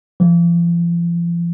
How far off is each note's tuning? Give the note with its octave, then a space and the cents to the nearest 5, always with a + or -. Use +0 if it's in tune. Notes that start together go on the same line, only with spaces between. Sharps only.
F3 -40